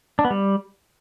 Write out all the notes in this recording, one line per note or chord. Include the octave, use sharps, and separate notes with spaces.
D4
B3
G3